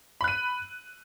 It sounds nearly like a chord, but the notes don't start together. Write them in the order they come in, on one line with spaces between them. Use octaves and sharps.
B5 F#6 D#7